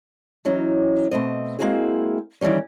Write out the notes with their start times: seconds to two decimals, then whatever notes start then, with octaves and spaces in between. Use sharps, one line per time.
0.45 E3 F#3 C#4 D#4
1.11 B2 A3 C4 D#5
1.59 G#3 A#3 C4 E4 F#4 G#4
2.41 D#3 E3 F#3 G3 C#4